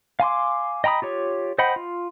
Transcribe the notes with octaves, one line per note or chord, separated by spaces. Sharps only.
F5 G#5 C6 D6
D#5 G5 A#5 B5 D#6
F4 G4 C#5
C5 D#5 F#5 G5 B5
F4